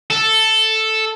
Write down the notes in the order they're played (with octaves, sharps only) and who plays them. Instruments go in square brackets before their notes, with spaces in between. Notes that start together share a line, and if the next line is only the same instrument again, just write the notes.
[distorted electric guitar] A4